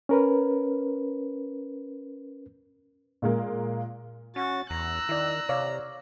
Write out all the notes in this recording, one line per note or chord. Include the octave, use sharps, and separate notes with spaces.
C#4 A#4 B4
A#2 G#3 A#3
C#4 F#4 A6
E2 A#5 E6 F#6
D#3 E4 D5
C3 C#5 D5 F5